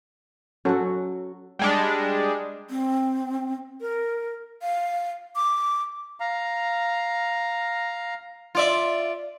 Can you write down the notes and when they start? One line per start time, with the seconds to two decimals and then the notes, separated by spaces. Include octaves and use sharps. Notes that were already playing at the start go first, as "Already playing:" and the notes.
0.65 F#3 C#4 F#4 A4
1.59 G3 G#3 D4
2.70 C4
3.81 A#4
4.62 F5
5.36 D6
6.20 F5 A#5
8.55 F4 D5 E5